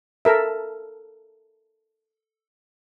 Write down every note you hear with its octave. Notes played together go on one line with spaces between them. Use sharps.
A4 A#4 E5